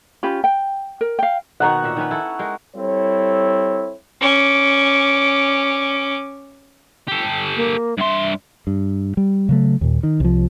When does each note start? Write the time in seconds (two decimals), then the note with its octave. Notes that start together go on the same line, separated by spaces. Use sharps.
0.23 C#4 F4 G4 B5
0.44 G5
1.01 A#4
1.19 F5 G5
1.60 B2 D#3 C4 F#5 A#5 C#6
1.84 A#2 E5
1.96 D#3 C#4 B4
2.11 E4 A4
2.39 G#3 A#4 G5
2.75 G3 C4 E4 A4 C#5
4.21 C#4 D6
7.08 G4 A4
7.56 A#3
7.98 G2 E5 C6
8.67 G2
9.17 G3
9.49 C#3 F#3 A3
9.81 D#2 A#2
10.03 D#3
10.20 C2 F3